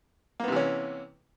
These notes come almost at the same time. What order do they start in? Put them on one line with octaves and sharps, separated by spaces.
A#3 B3 C3 E3 C#4